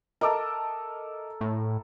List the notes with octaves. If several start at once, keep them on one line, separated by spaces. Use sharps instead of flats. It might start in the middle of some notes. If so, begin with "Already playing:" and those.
A4 A#4 D#5 E5 D6
A2